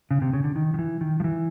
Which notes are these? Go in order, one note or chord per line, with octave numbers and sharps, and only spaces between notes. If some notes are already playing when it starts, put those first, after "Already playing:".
C#3
C3
C#3
D3
D#3
D#3
E3
D#3
F3
E3